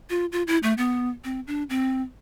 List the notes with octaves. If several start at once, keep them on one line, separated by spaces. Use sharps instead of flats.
F4
F4
E4
A3
B3
C4
D4
C4